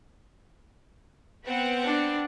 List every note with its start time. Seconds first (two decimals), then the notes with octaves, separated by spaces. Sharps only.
1.46 B3 C4 F#5
1.84 D4